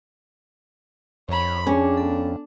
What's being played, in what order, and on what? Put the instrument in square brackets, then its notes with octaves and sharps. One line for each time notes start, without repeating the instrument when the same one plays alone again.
[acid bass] F2 [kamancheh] C#5 B5
[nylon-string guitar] C#4 [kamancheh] D4 [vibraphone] G#4 C#5 D6
[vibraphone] B3 A4